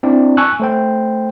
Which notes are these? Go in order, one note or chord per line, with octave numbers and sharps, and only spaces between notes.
C4 D4 E4 D5
G#5 A5 C#6 E6 F#6
A3 C5 G5